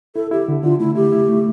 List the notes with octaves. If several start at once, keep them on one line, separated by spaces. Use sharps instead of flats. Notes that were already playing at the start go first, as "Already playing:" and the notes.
E4 A4
E4 G4
D3
D3 F4
A3 E4
E4 G4
E4
A3